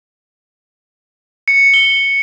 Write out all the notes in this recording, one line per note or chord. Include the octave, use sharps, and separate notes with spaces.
C#7
G7